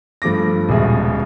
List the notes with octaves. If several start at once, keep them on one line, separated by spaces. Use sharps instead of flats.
G2 F3 A3 D6 A#6
D#1 C#2 B2 G#4 E5